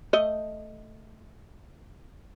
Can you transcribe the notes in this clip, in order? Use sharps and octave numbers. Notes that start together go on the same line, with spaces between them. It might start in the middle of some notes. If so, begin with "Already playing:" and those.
A3 D#5